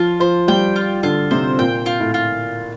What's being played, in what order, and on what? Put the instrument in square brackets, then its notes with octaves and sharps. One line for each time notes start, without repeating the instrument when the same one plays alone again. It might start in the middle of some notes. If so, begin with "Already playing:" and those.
Already playing: [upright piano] F3 [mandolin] F4
[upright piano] F3 [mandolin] C5
[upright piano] G3 [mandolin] G5
[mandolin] F4
[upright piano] D3 [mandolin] F4
[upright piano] C3 [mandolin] C5
[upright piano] A#2 [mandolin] G5
[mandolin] F4
[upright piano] A2
[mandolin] F4